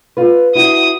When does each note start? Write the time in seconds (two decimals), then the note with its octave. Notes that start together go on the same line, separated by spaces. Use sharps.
0.17 F4 B4
0.55 E4 F#4 D#6